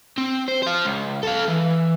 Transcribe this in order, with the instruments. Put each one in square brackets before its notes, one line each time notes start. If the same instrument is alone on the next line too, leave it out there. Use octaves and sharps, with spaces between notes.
[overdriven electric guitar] C4
C5
C5 F5
C#2
A4 F5
E3